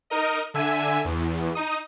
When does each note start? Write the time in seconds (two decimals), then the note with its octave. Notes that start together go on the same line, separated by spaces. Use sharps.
0.10 D#4 A#4 D#5
0.54 D3 E5 G#5
1.05 E2
1.55 D#4 D#6